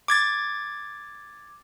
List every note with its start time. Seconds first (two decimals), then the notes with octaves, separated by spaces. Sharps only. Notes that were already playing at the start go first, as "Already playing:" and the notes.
0.08 D6 G#6 A6